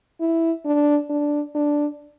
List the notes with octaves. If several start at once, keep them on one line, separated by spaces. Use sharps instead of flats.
E4
D4
D4
D4